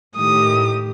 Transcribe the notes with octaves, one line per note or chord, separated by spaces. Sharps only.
A2 D#3 G4 D#6